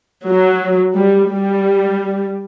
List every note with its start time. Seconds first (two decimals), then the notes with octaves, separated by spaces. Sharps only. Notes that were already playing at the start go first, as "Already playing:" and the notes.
0.28 F#3
0.96 G3
1.30 G3